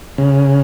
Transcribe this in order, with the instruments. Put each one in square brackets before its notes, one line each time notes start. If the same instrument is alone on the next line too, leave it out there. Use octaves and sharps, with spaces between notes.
[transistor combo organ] C#3